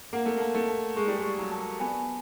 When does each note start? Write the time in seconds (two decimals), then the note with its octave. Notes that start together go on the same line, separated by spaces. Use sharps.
0.13 A#3 F#5
0.26 A3
0.37 A#3
0.40 A5
0.54 A3
0.68 A5
0.96 G#3 C#6
1.07 G3
1.18 G#3
1.24 C#6
1.38 F#3
1.52 A5
1.80 B3 G#5